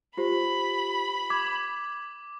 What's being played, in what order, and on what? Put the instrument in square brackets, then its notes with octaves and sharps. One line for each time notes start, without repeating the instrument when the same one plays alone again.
[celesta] F4 G4 C5 [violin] B5
[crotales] D6 [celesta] G#6